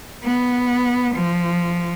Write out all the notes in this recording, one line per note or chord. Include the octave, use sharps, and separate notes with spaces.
B3
F3